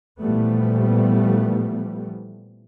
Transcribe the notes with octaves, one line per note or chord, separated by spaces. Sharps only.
A#2 E3 F3 G3 A3 B3